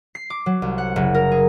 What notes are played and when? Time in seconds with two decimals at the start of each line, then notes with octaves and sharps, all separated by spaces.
0.15 C7
0.30 D6
0.46 F#3
0.62 C2
0.78 F#5
0.96 F#1
1.14 A#4
1.32 G#4